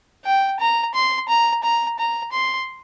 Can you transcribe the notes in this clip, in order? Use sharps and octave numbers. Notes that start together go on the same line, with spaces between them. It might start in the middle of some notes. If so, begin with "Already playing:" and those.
G5
A#5
C6
A#5
A#5
A#5
C6